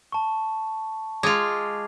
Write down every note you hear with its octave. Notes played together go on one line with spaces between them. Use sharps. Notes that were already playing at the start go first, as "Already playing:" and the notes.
A5 C#6
G#3 F4 D6